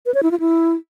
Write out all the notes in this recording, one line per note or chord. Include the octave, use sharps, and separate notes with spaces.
B4
C#5
E4
F4
E4